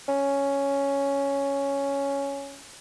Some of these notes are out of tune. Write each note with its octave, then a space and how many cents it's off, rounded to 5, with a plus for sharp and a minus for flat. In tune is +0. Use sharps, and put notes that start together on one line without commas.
C#4 +5